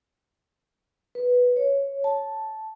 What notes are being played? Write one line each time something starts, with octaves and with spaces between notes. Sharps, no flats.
B4
C#5
A5